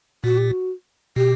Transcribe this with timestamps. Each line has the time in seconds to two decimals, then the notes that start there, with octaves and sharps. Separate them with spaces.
0.24 A#2 F#4
0.38 G4
0.50 F#4
1.16 B2 G4